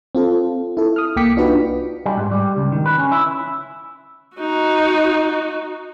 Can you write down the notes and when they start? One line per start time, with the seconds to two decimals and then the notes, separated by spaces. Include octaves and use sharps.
0.15 C4 F4 A4
0.77 E4 A4
0.96 D#6 F6
1.16 C2 A#3 G5 D6 B6 C#7
1.37 D4 D#4 F4 F#4 B4
2.06 G3
2.17 G#2
2.32 G3
2.57 C#2
2.72 D#3
2.86 B4
2.98 C#4
3.12 E4
4.37 D#4 F#4